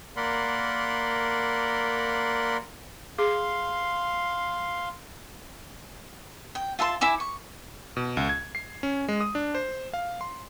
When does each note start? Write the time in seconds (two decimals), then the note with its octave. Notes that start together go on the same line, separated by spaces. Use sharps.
0.17 A#3 A#4 D5 F#5 B5 C6
3.19 G#4 F5 C6
6.55 G5
6.79 F4 E5 A5 C6
7.01 E4 E5 G#5 D6
7.20 C#6
7.97 B2
8.17 C#2
8.29 G#6
8.55 C7
8.83 C#4
9.08 G#3
9.20 D#6
9.35 D4
9.55 C5
9.93 F5
10.21 C6